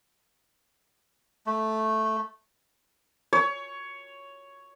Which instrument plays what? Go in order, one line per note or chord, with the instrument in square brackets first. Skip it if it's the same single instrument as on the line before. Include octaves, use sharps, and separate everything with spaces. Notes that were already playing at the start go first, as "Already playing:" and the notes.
[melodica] A3
[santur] C#5